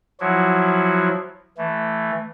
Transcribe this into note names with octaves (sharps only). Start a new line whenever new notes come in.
F3 F#3 E4 F#4
E3 A3